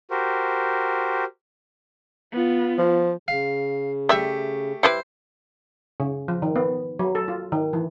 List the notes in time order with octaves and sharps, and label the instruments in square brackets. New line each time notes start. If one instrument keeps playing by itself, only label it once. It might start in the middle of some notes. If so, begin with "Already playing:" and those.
[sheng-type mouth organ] F#4 G4 A#4 C5
[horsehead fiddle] B3 F4
[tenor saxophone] F3
[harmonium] C#3 [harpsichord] F5
[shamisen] G3 E5 [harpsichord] A3 G4
[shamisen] G3 E4 B4 [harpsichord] C5
[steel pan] C#3
F3
D#3
B3
F#3
A4
F4
D#3
E3